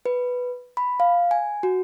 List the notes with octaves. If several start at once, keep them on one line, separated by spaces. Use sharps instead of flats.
B4
B5
F5
G#5
F#4